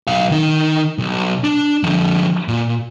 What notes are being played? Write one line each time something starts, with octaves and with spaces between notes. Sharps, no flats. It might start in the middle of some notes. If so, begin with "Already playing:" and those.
B1 F5
D#3 D#4
B1
D4
D3 F3
A#2